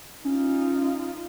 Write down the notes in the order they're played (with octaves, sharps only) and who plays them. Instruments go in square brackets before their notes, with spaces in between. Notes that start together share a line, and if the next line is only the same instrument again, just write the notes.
[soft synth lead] C#4 [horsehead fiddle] D#4 F4